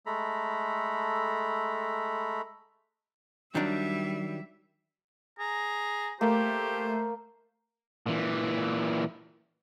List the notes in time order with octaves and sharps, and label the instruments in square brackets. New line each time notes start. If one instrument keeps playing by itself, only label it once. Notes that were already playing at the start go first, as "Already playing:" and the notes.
[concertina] G#3 A3 A4 A#5 B5
[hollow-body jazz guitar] D#3 F#3 D4 [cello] G3 E5
[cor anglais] G#4 [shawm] A#5
[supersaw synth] A3 [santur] A#3 [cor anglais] G4 [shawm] C5
[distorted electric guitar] A#2 E3